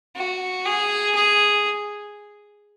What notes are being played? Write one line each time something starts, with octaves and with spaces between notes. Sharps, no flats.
F#4
G#4
G#4